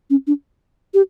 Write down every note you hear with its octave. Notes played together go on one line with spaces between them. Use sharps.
C#4
D4
G4